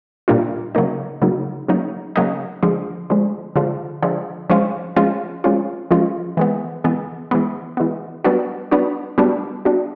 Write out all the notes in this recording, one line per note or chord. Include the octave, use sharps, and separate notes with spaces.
A#2 G3 A#3 D4 F4
C#3 F#3 A#3 D#4
C#3 F#3 A#3 D#4
C#3 F#3 A#3 D#4
C#3 F#3 A#3 D#4
D3 F3 G#3
D3 F3 G#3
D3 F3 G#3
D3 F3 G#3
F3 G#3 C#4 F4
F3 G#3 C#4 F4
F3 G#3 C#4 F4
F3 G#3 C#4 F4
E3 G#3 B3
E3 G#3 B3
E3 G#3 B3
E3 G#3 B3
G3 B3 D4 F#4
G3 B3 D4 F#4
G3 B3 D4 F#4
G3 B3 D4 F#4